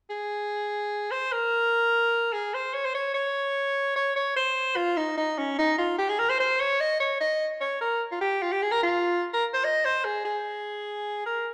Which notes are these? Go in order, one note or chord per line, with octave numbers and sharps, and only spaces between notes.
G#4
C5
A#4
G#4
C5
C#5
C5
C#5
C#5
C#5
C#5
C5
F4
D#4
D#4
C#4
D#4
F4
G4
G#4
A#4
C5
C5
C#5
D#5
C#5
D#5
C#5
A#4
F4
G4
F4
G4
G#4
A#4
F4
A#4
C5
D#5
C5
G#4
G#4
A#4